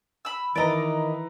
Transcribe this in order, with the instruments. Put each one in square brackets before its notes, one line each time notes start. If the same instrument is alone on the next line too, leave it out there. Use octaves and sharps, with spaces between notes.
[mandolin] B5 E6
[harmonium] D#3 [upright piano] E3 B4 A#5 [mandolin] D5 D#5